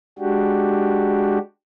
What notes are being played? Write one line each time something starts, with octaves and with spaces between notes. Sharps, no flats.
G#3 D4 F#4 G4